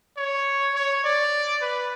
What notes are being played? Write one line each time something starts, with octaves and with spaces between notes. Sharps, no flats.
C#5
C#5
D5
B4